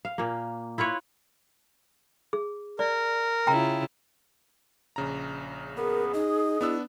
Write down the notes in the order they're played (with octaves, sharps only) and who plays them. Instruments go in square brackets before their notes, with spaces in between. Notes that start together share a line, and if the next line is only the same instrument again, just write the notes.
[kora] F5
A#2 A#3
E4 F4 B4 C#5
[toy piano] G#4
[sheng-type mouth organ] A#4 [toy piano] D5
[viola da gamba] C#3 E4 F4 [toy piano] G5 A#5
[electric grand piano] A#1 C#3 A#5
[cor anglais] B3 [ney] G#4 [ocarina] A#4
[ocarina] D#4 [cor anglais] D#5
[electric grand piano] B3 D4 E6 [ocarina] E4